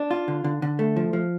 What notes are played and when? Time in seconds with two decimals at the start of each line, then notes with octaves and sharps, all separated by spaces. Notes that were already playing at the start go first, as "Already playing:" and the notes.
Already playing: D4
0.11 F4
0.28 D3
0.44 D3
0.62 D3
0.79 A3
0.96 F3
1.13 F3